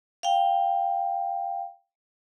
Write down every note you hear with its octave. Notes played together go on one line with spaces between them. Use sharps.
F5 G5